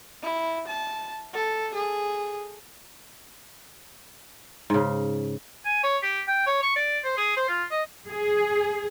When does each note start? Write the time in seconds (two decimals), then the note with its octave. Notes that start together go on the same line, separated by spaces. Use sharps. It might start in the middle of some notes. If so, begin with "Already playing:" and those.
0.23 E4
0.68 A5
1.34 A4
1.74 G#4
4.70 G#2 C#3
5.65 G#5
5.83 C#5
6.03 G4
6.27 G5
6.46 C#5
6.63 C#6
6.76 D5
7.04 C5
7.17 G#4
7.37 C5
7.48 F4
7.71 D#5
8.07 G#4